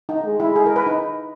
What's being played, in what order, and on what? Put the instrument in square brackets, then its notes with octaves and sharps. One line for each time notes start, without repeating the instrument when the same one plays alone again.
[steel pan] D#4
[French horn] G#3
[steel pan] E4
G#4
A#4
B4
D#4